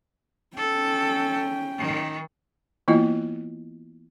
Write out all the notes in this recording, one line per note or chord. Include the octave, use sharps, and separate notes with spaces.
C#4 A4 G5
D#3
E3 A#3 B3 E4 F4 D#5